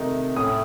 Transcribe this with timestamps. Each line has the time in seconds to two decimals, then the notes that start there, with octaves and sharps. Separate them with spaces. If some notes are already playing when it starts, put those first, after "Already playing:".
Already playing: C3 D#3 A3 D#4
0.36 A2 A3 C#4 D#6